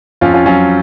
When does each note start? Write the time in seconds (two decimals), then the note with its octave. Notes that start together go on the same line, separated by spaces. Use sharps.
0.21 F2 C#4 F4
0.34 C#4 F4
0.46 F#3 C#4 F4